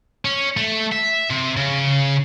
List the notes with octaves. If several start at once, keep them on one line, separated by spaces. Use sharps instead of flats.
C#4
A3
E5
C3
C#3